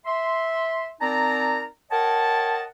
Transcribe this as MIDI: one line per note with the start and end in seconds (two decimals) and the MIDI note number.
0.05 0.88 76
0.05 0.88 84
1.01 1.64 60
1.01 1.64 63
1.01 1.64 70
1.01 1.64 74
1.01 1.64 81
1.01 1.64 82
1.91 2.64 70
1.91 2.64 73
1.91 2.64 75
1.91 2.64 78
1.91 2.64 79
1.91 2.64 81